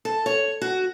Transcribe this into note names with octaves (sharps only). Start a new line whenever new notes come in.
A4
C#5
F#4